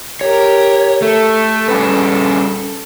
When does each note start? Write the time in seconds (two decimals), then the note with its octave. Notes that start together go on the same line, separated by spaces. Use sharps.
0.21 G4 A#4 C#5
1.02 A3 A4
1.68 G3 C#4 B4